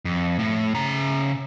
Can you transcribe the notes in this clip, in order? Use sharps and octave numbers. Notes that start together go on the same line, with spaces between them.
F2
A2
C#3 A#5